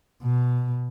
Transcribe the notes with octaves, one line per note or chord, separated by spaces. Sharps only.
B2